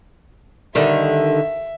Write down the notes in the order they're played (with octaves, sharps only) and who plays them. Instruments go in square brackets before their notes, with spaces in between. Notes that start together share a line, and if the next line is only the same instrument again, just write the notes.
[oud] D3 D#3 G3 [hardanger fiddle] E5